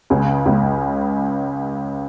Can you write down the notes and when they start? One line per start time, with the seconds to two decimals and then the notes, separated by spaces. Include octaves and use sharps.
0.10 C#2 C#3
0.46 C#2 C#3